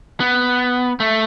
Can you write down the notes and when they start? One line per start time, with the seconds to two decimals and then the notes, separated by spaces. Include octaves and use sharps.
0.20 B3
1.00 A3